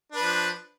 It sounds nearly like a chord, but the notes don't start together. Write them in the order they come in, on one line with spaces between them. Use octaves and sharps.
D4 B4 F3